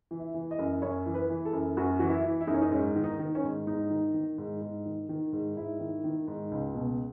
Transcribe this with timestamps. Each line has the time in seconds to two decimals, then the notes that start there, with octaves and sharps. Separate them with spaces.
0.11 E3
0.20 E5
0.35 E3
0.51 D#5
0.59 F#2
0.82 F#2 C#5
1.06 E3
1.14 B4
1.30 E3
1.45 A4
1.53 F#2
1.77 F#2 F#4
1.99 E3 F#4
2.09 E4
2.24 E3
2.41 E4
2.47 F#2 D#4
2.54 C#4
2.62 D#4
2.72 G#2 C#4
2.95 D#3
3.04 D#4
3.19 D#3
3.35 C#4
3.43 G#2
3.67 G#2 D#4
3.90 D#3
4.14 D#3
4.38 G#2
4.61 G#2
4.86 D#3
5.09 D#3
5.33 G#2
5.57 G#2 E4
5.80 D#3
6.04 D#3
6.28 G#2
6.51 C#2
6.74 B2